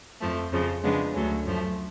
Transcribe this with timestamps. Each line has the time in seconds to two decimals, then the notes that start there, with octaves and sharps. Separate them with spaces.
0.20 F2 F3 A3
0.52 F2 C#3 F3
0.83 C#3 F3 G#3 B3 D4
1.13 D2 D3 F#3 C#4
1.44 F#2 F3 A3